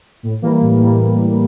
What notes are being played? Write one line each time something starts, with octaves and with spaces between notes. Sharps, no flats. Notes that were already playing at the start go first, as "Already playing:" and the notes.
A2
E3 G3 A#3
A2
E3 G3 A#3